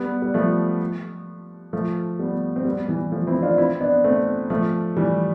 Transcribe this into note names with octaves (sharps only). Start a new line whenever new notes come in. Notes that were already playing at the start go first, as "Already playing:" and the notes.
Already playing: G3 B3
G3
F3 A3
F3 A3
G3 B3
C4
G3 B3
E3 G3
F3 A3
C4 E4
D4 F4
C4 E4
B3 D4
A3 C4
F3 A3
E3 G3